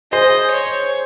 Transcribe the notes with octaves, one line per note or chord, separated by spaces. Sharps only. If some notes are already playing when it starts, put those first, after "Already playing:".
G#4 C5 D#5
C#5